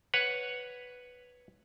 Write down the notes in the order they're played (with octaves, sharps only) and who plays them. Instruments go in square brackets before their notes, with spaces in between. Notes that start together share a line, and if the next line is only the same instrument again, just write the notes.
[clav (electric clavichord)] B4 C#5 F#5